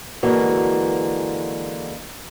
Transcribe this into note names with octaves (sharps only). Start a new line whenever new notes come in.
D3 E3 G#3 A#3 F#4